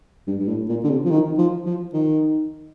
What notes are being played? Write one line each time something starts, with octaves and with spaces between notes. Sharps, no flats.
G2
G2
A2
A#2
D3
C3
F3
D#3
F3
F3
D#3